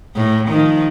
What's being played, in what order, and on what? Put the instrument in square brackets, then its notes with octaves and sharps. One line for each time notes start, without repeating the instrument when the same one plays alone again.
[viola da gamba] A2
D#3 F3